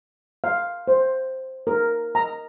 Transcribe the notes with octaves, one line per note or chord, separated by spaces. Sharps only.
F5
C5
A#4
A#5